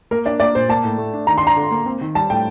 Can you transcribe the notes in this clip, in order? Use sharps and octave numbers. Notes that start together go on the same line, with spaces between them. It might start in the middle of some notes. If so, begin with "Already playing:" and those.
A#3 A#4
D4 D5
A#3 D5
A#2 C5
A#3 A5
A2
A3
D4
D#3 A#5
C6
D4 A#5
D3
A#3
C4
D#3
G3 A5
A2 G5